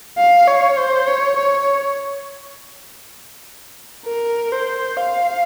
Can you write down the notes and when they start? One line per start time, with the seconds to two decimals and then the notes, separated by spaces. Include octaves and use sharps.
0.18 F5
0.48 C#5
0.78 C5
1.07 C#5
1.37 C#5
4.07 A#4
4.52 C5
4.97 F5